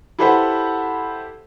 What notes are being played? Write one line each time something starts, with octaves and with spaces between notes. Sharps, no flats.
E4 G4 A4 B4 C5 F#5